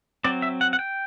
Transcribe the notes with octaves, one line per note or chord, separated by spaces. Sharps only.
F#3 C4 D5
E5
F#5
F#5
G5